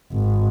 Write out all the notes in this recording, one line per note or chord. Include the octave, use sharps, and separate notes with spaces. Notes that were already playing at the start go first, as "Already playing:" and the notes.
G#1